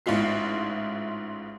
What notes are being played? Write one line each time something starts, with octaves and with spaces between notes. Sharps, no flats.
A1 G#2 E4 F4 C7